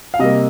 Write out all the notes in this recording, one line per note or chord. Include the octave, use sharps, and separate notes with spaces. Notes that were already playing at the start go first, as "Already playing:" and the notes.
F5
C3 G3 A#3 D#5